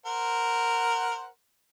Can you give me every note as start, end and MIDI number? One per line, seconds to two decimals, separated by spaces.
0.06 1.28 70
0.06 1.28 72
0.06 1.28 78